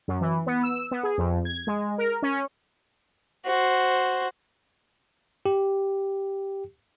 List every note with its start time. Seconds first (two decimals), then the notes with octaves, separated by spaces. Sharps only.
0.08 F#2
0.21 E3
0.46 B3
0.63 E6
0.91 B3
1.03 G#4
1.18 F2
1.45 G#6
1.67 G#3
1.98 A#4
2.22 C#4
3.46 F#4 C5
5.46 G4